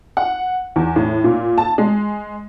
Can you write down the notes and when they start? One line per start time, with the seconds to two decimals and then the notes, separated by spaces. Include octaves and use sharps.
0.17 F#5
0.76 E2
0.96 A2
1.24 A#2
1.58 A5
1.78 G#3